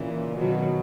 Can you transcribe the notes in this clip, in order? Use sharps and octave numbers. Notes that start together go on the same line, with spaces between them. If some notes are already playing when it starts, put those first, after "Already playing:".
Already playing: A#2 C#3 E3
B2 D#3 F#3